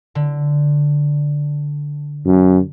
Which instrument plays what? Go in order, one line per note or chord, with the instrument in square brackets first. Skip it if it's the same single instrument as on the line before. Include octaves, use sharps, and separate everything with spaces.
[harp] D3
[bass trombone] F#2